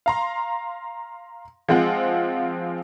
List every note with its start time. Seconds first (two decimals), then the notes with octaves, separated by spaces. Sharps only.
0.06 F5 A#5 C6
1.69 F3 G#3 C4 F4 F#5